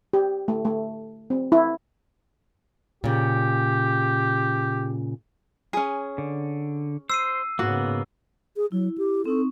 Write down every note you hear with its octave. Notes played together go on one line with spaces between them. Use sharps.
G4
A3
A3
C4
E4
A#2 C#3 G4
C#4 G#4
D3
C5 E6 C7 D#7
G#2 C#3 A#3 B3 F#4
G#4
F#3 E4
G4
C4 D#4 A4 C#6